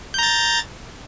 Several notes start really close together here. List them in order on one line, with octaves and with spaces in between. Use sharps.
G6 A#5 A6